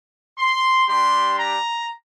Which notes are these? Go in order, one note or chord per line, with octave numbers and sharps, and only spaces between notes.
C6
G3 D4 G4 C6
A#5